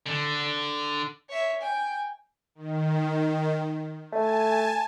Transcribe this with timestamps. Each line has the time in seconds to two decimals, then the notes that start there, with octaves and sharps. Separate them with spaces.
0.07 D3
1.29 C#5 E5
1.62 G5 G#5
2.55 D#3
4.12 A3 G#5 A5